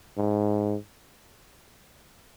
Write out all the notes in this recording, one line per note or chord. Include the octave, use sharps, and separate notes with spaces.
G#2